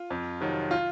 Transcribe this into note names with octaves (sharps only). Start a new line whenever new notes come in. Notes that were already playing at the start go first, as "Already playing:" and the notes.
Already playing: F4
F2
C3 D#3 F#3
F4